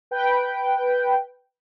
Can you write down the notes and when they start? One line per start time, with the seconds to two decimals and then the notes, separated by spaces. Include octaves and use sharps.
0.11 B4 G5